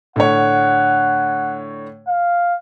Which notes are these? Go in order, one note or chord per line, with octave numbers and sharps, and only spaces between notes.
A2 D3 C#5 F#5
F5